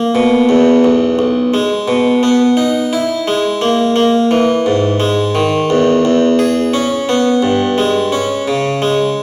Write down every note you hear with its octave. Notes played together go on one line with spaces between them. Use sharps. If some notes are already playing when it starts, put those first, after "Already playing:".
Already playing: A#3
B2
E2
B1
B1
G#3
B2
B3
D#4
E4
G#3
A#3
A#3
E3
G#2
G#3
D#3
E2
E2
G#4
C#4
B3
G2
G#3
C#4
C#3
G#3